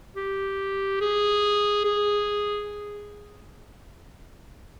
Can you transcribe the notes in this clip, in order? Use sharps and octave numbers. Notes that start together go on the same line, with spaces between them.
G4
G#4
G#4